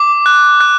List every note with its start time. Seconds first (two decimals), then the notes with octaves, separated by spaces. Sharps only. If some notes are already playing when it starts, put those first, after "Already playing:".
Already playing: D6
0.26 F#6
0.61 F#6